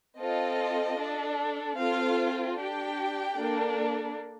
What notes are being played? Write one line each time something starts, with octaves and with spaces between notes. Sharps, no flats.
C4 F4 A4 D#5
D4 A4
C4 F4 A4 F5
D4 G4 G5
A#3 D4 A4